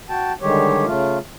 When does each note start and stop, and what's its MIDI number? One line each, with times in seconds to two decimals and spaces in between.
0.09 0.33 66
0.09 0.33 79
0.09 0.33 81
0.42 0.85 50
0.42 0.85 51
0.42 0.85 55
0.42 0.85 56
0.42 0.85 67
0.42 0.85 73
0.86 1.18 49
0.86 1.18 57
0.86 1.18 65